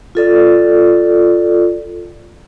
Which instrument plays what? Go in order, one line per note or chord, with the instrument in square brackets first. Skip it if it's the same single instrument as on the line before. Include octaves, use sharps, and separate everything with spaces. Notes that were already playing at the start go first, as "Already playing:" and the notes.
[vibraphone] F4 A4 D5